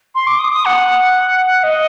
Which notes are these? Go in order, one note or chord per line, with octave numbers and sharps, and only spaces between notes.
C6
D6
D#6
D#6
F#5
D#5